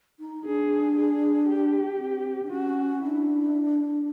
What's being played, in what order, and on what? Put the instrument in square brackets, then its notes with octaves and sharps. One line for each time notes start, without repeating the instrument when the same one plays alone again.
[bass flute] D#4
[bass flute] D4 [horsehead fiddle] G#4
[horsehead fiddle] G#4
G4
[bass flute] C4
D4
[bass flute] C#4 [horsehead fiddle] F#4
[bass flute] D4 [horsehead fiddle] E4